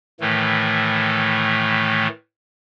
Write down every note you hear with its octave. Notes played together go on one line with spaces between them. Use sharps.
A2 D#3 E3 A3